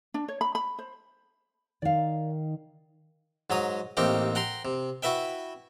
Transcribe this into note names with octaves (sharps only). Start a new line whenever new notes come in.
D4
C#5
B5
B5
C5
D#3 D5 F5
G#2 F#3 A#5 D#6
A1 A#3 C4 D#4 G4 G5
F#5 G5 A#5 C6
C3
E4 F#4 B4 E5 G5